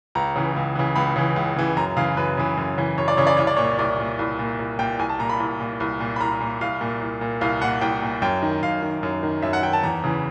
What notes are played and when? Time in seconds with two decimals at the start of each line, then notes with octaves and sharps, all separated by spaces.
0.15 C#2 A#5
0.36 C#3 E3
0.56 C#2
0.75 C#3 E3
0.96 C#2 B5
1.16 C#3 E3
1.36 C#2
1.56 C#3 E3
1.77 F#2 A#5
1.96 C#3 E3 F5
2.17 F#2 B4
2.37 C#3 E3
2.57 F#2
2.78 C#3 E3
2.98 F#2 C#5
3.08 D5
3.17 C#3 E3 C#5
3.27 D5
3.37 C2 C#5
3.47 D5
3.57 A#2 C#5
3.79 C2 D5
3.99 A#2
4.19 C2
4.39 A#2
4.59 C2
4.79 A#2 G5
4.99 C2 G#5
5.09 A5
5.19 A#2 A#5
5.29 B5
5.40 C2
5.60 A#2
5.80 C2
6.00 A#2
6.16 B5
6.20 C2 A#5
6.40 A#2
6.61 C2 F5
6.81 A#2
7.01 C2
7.21 A#2
7.41 C2 F5
7.61 A#2 F#5
7.81 C2 G5
8.02 A#2
8.22 F#2 G5
8.42 D#3
8.62 F#2 F5
8.83 D#3
9.03 F#2
9.23 D#3
9.42 F#2 E5
9.53 F#5
9.63 D#3 G5
9.73 A5
9.83 E2 A#5
10.04 C#3 E3